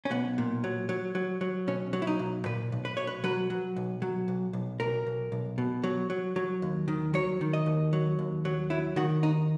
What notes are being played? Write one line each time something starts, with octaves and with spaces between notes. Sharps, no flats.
C#4
B1 B3
A#2
F#3
F#3
F#3
F#3
B1 C#4
F#3
E4
D#4
B1
A#2 B4
B1
B4
B1 C#5
B4
F#3 B4
F#3
B1
F#3
B1
B1
B1 A#4
B1
B1
B2
F#3
F#3
F#3
D#2
D#3
F#3 C#5
D#3
D#5
D#2
F#3
D#2
F#3
F#3 E4
D#3 F#4
D#2 D#4